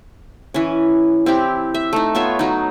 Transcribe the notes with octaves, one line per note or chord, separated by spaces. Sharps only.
E3 C#4
C4 E4 G4
E5
A3 D#4
B3 F4 C#5 E5
F#3 D#4